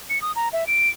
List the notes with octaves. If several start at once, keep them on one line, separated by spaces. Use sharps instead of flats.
C#7
D#6
A#5
E5
D7